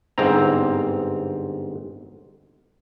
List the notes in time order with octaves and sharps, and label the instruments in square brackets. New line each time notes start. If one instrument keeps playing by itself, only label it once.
[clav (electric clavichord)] G1 G#2 C4 A#5